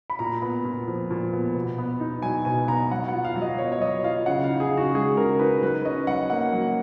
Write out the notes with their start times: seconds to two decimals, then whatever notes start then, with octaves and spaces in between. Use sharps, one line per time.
0.10 B5
0.19 A#2 A#5
0.42 B3
0.65 A#2
0.88 F3
1.11 A#2
1.33 B3
1.55 B2
1.78 B3
2.00 D#4
2.22 F#3 G#5
2.45 B2 G#5
2.68 B3 A#5
2.91 F#3 F#5
3.08 F#5
3.14 F4
3.25 F5
3.36 F#3
3.42 D#5
3.58 B3 C#5
3.72 C#5
3.81 F#3 D#5
4.04 F4 F5
4.26 C#3 F#5
4.44 F5
4.50 D#4
4.60 G#4
4.72 C#3
4.77 F#4
4.94 G#3 G#4
5.17 C#3 A#4
5.39 D#4 B4
5.62 F#3 B4
5.85 C#4 D#5
6.07 F#3 F#5
6.30 A#3 F#5
6.53 F#3